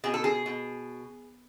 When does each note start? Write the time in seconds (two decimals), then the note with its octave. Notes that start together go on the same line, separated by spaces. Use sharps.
0.04 B2 G#4
0.14 A4
0.24 G#4
0.46 B2